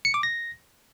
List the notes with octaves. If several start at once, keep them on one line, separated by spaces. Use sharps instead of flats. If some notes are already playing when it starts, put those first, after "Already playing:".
C#7
D6
A#6